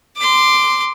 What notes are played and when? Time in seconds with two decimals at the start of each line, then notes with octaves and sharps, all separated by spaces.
0.17 C6 D6